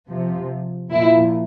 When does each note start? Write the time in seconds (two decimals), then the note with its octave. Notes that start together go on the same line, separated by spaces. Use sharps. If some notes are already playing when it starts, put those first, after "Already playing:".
0.09 C3 F3
0.92 A#2 F3 E4